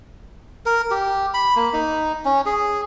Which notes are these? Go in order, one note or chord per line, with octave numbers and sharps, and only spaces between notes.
A#4
G4
B5
A#3
D#4
C#4
G#4